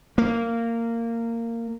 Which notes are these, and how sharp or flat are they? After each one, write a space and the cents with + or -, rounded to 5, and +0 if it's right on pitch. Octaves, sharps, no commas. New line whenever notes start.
A#3 -15